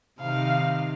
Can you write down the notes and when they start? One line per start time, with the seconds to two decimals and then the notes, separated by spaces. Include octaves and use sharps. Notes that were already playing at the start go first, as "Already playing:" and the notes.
0.20 C3 D#3 F5